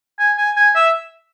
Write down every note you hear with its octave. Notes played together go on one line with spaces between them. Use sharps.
G#5
G#5
G#5
E5